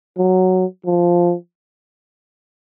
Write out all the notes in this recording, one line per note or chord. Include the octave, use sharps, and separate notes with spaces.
F#3
F3